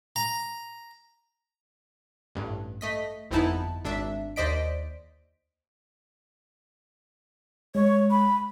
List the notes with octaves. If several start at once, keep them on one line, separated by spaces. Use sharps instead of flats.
A#5
A1 G2
A3 D#5 B6
G1 F2 B3 D#4 E4 A5
G#1 D4 E5
D#2 C5 D5 D#5 B6 D7
G#3 C#5
B5